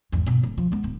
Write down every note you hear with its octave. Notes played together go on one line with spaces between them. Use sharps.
G#1 E2
G2 B2
D1
F3
G#3 B3
D1